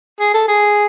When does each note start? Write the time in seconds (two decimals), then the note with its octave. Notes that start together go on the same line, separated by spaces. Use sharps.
0.20 G#4
0.34 A4
0.48 G#4